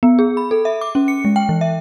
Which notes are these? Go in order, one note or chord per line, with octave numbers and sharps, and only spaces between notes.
B3
G#4
B5
A4
E5
D6
C#4
C#7
G#3
G5
E3
E5